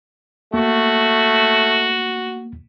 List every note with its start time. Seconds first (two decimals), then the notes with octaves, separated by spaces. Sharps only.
0.54 A3 A#3 F#4